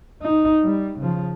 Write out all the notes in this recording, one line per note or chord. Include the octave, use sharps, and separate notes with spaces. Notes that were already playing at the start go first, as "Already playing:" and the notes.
D#4
G3
C#3 F3